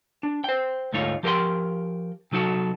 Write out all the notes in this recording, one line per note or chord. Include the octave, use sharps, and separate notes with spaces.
D4
C5 G5
D2 G#2 A3 D#4 F4 C#5
F3 G4 A#4 B4 G5 C6
C3 F#3 D#4 F#4 A4